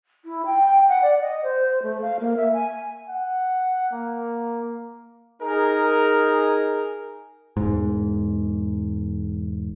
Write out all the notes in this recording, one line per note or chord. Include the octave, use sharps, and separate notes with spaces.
E4
G5
F#5
D5
D#5
C5
A3
F5
A#3
E5
G#5
F#5
A#3
D#4 G#4 A#4
E1 G#2